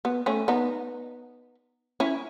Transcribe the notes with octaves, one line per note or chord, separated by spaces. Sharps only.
B3
A3 C#4
B3 D#4
C#4 E4